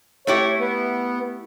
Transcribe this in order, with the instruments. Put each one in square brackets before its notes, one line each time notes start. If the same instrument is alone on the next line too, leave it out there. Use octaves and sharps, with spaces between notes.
[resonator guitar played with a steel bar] A3 E4 G4 [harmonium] C#5
[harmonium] B3